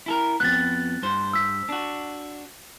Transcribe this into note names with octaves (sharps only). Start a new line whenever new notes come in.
E4 A4 A#4
F2 G#2 B3 F#6 A6
G2 C5
E6 B6
D4 F#4